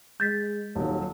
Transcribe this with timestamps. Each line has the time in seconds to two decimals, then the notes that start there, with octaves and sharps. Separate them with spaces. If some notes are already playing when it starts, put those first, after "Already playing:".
0.20 G#3 G6 A6 B6
0.75 D#1 D#2 F#3